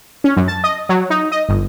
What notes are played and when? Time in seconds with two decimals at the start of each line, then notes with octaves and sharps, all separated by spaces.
0.24 C#4
0.36 F#2
0.48 A5
0.64 D#5
0.89 F#3
1.10 D#4
1.32 D#5
1.49 G1